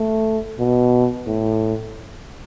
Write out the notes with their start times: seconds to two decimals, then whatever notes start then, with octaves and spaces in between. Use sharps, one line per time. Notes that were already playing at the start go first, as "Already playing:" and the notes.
Already playing: A3
0.59 B2
1.26 A2